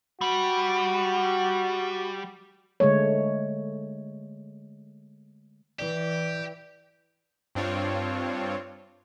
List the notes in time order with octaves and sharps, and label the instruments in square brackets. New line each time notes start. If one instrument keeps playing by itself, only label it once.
[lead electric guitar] G3 [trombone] F#4
[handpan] D3 G#3 A3 C#5
[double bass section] E3 [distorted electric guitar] G4 [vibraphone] D5
[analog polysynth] G2 C4 D4 F4 C#5